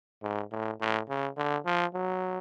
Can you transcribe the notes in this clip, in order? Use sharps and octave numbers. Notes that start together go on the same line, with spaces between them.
G#2
A2
A2
C#3
D3
F3
F#3